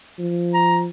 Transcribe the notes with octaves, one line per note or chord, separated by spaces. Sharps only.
F3
A#5